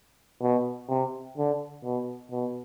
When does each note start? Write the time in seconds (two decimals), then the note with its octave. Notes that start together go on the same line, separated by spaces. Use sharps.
0.42 B2
0.89 C3
1.38 D3
1.84 B2
2.31 B2